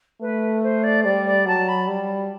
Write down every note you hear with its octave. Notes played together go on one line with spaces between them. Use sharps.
A3 B4
C5
D5
G3 D5
D5
F#3 A5
B5
G3